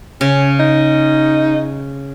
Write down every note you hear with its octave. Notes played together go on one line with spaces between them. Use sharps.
C#3 C#4
D#4